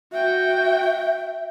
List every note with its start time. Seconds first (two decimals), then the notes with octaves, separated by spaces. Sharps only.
0.13 F#4 E5 G5